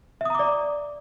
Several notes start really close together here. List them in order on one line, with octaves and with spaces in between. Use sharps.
E5 D#6 A#5 D6 D5